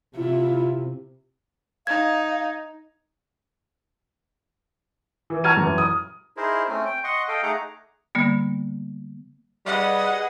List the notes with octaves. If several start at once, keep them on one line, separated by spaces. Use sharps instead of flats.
C3 E4 F4
D#4 F5 G#6
E3
A5 A#5 C#6 F6 G#6 D#7
F#2 E3
D#6
D#4 E4 G#4 A#4 C5
A3 C4 C#4
G5
D#5 F#5 C6 C#6
A4 D#5 F5 G5
A3 D#4 G#4 F#5 A#5 D6
D3 G3 A#3 B3
G3 G#4 B4 D#5 F#5